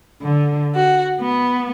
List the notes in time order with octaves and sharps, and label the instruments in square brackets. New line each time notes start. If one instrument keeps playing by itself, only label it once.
[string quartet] D3
F#4
B3